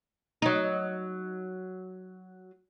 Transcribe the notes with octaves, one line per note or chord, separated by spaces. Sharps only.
F#3 D#4